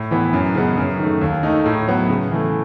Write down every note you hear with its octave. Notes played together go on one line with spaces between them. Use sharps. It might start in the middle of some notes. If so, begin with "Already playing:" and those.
Already playing: A2
E3 B3
F#2
C#3 G#3 B3
F#2
D#3 A3
D#2
D#3 A3 D#4
A2
F#3 B3
C#3
E3 A3